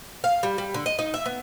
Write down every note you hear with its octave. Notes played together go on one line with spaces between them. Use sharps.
F5
G3
G3
D3
D#5
D#4
E5
B3